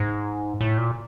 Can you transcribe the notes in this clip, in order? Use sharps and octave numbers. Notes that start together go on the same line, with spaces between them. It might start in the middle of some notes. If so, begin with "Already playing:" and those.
Already playing: G#2
A2
A#2